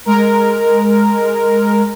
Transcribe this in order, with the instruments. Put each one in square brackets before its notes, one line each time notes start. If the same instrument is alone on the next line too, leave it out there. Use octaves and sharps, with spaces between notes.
[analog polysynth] G#3 A#4